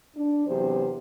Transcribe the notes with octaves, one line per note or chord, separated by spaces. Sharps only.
D4
E2 C3 F#3 G4 C5